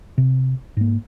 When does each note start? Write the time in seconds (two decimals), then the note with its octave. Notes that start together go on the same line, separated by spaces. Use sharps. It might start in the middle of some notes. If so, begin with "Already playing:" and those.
0.18 C3
0.77 G#2 A#3